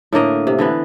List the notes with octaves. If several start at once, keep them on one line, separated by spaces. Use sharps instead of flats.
A2 D3 A#3 D#5
C3
D3 E3 B3